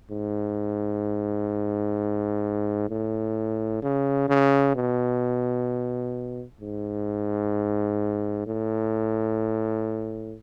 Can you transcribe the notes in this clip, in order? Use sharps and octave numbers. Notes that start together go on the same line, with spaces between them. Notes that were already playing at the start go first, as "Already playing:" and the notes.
G#2
A2
C#3
C#3
B2
G#2
A2